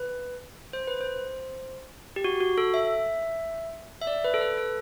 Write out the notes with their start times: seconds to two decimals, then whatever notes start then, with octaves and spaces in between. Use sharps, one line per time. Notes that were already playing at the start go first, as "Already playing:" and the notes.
Already playing: B4
0.73 C5
0.88 B4
1.01 C5
2.16 G4
2.24 F#4
2.40 F#4
2.58 A4
2.74 E5
4.02 E5
4.07 D5
4.25 B4
4.34 A4
4.41 B4
4.58 A4